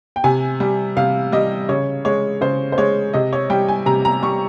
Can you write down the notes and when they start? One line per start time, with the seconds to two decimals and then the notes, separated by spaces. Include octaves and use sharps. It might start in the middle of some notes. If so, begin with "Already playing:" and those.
0.16 G5
0.24 C3 G#5
0.60 G3
0.97 C3 F5
1.32 G3 D#5
1.69 C#3 C#5
2.05 G#3 C#5
2.41 C#3 C5
2.72 C5
2.78 G#3 C#5
3.13 C3 D#5
3.33 C#5
3.50 G3 G5
3.68 G#5
3.86 C3 A#5
4.05 A#5
4.23 G3 C#6